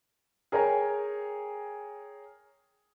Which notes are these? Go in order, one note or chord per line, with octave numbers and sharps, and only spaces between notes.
G#4 A#4 C#5 G5 G#5 A#5